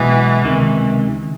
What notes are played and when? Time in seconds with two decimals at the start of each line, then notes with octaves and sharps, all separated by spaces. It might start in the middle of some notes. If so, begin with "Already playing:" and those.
Already playing: B1 B2 E3 G#3 B3
0.42 C#2 C3 D#3